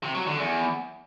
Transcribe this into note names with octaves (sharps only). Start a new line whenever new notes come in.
C3
F#3
D3
E2